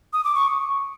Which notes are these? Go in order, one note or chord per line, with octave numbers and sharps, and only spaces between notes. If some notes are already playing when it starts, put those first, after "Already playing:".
D#6
D6
C#6